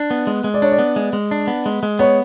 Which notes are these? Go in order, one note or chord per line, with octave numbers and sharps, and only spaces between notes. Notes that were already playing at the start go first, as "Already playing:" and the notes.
Already playing: D4
B3
G#3
G#3
D5
D4 C#5
D5
B3
G#3
G#3
D4
B3
G#3
G#3
B3 C#5